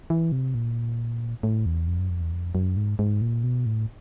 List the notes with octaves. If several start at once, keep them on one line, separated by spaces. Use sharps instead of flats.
E3
C3
A#2
A2
E2
F2
F#2
F2
E2
F2
F#2
G#2
G#2
A#2
B2
A2